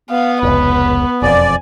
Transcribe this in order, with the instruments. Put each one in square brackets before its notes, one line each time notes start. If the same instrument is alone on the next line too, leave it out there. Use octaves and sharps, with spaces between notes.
[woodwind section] B3 [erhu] F5
[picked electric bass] F1 C#2 [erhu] B4
[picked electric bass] E1 F2 [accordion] D5 [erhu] G#5